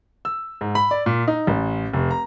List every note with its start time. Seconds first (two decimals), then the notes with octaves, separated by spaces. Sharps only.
0.25 E6
0.61 G#2
0.75 B5
0.91 D5
1.06 A#2
1.28 D#4
1.47 A1
1.93 F1
2.11 A#5